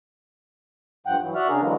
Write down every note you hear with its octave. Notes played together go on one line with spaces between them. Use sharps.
G2 F3 F#5 G5
E3 F#3
F#4 D5 E5 F#5 F6
C#3 D4 G#4 A#4
D3 E3 F#3 G#3 A#3